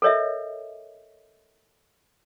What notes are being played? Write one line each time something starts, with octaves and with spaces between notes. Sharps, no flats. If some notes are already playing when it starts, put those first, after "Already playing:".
A4 A#4 C#5 D#5 E5